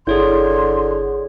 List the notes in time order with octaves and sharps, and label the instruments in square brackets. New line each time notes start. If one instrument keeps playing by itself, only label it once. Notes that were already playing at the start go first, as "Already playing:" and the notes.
[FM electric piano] G1 E4 [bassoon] D3 [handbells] G#4 C#5 G6 [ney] C6